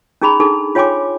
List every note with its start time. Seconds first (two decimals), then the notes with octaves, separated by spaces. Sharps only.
0.22 C#4 D#4 G#4 A#5 B5
0.40 D4 D#4 G#4 A4
0.75 F4 C#5 G5 G#5 C6 D6